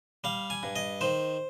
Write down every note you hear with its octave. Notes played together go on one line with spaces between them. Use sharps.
G3 F5
G#5
G2
D#5
D#3 C5